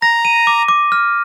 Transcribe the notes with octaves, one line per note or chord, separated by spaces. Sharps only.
A#5 A#6
D#7
D6
D6
F6